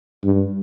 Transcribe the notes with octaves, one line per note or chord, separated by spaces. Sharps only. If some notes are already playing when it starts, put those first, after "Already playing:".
G2